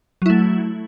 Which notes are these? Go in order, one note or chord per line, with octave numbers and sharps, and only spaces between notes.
F#3 A3 E4